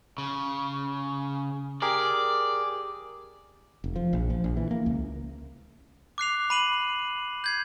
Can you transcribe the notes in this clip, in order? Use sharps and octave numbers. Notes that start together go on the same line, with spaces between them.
C#3
G4 G#4 A#4 D5
F1
F3
A#1
F3
A#1
E3
A#3
C#2
D6 F#6 C7 F7
B5 D#7 F#7
G6 G#6 C7